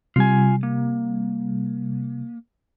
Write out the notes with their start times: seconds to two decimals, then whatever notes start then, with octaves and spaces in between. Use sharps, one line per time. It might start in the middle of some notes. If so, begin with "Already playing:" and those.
0.16 C3 G3 F4 G#5
0.63 A#3